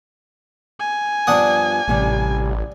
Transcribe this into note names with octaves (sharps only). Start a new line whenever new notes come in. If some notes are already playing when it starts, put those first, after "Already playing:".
G#5
G2 F3 B3 D4 F#5 D#6
A1 A2 C3 G3